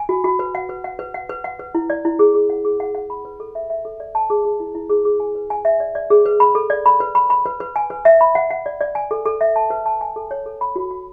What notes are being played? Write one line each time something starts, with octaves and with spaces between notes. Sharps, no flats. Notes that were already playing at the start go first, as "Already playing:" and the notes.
Already playing: G#5
F#4
F#4
B4
F#5
B4
F#5
B4
F#5
B4
F#5
B4
E4
D5
E4
G#4
G#4
F#5
G#4
F#5
F#5
B5
B4
A4
E5
E5
A4
D5
A5
G#4
G#4
E4
E4
G#4
G#4
G#5
B4
G#5
E5
D5
D5
G#4
B4
B5
A4
D5
B5
B4
B5
B5
B4
B4
G#5
B4
E5
B5
F#5
F#5
D5
D5
G#5
A4
A4
E5
A5
B4
A5
G#5
A4
C#5
A4
B5
F#4
F#4